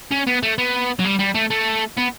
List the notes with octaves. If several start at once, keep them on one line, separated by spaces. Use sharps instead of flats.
C#4
B3
A3
B3
F#3
G3
G3
A3
A3
B3